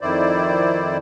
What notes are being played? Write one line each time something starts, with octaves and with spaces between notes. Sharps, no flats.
F2 D#3 E4 C5 D5